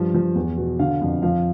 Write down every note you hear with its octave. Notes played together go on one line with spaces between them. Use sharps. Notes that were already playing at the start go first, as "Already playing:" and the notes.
Already playing: G2 F3
F3
E2
B2
D3 F5
F2
F3 F5